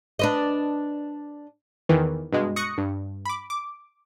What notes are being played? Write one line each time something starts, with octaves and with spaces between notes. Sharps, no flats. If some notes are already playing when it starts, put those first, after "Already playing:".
D4 B4 D#5
E2 D#3 E3
G2 B2 G#3
C#6 D#6 F#6 A#6 C#7
G2
B5 D6
D6